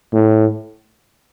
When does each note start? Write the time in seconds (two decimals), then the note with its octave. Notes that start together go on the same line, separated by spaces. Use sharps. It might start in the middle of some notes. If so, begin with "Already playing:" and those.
0.13 A2